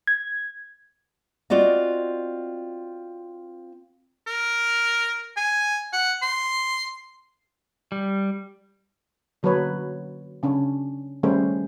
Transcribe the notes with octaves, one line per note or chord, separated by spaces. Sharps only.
G#6
C4 F4 F#4 D5 D#5
A#4
G#5
F#5
C6
G3
D3 F#3 A#3 B4 C#5
C#3 C#4 D4 C#5
D#3 G3 A3 C#4 G#4 C5